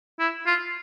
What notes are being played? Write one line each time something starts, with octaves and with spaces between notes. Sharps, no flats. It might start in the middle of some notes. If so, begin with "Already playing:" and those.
E4
F4